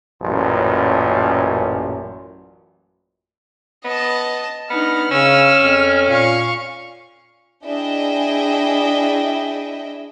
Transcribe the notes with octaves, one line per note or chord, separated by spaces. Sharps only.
A1 F#2 A#2
B3 D#5 A5
B3 D4 D#4 F6
C#3 C#4 E6
F2
A#2 F5 C#6
D4 E4 G#4 D#5 E5 G5